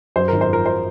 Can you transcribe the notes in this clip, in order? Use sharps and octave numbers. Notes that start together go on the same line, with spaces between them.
F#2 C5
A#4
G#1
C5
F3 A#4
C5